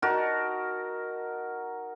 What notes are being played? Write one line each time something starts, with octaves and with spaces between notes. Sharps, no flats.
D#4 F#4 A#4 A5